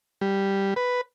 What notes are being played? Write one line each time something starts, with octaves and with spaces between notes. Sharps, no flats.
G3
B4